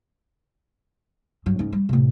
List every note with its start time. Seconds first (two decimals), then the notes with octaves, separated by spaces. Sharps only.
1.46 G2 F#3
1.59 G#2 C#4
1.73 G3
1.89 A2 C3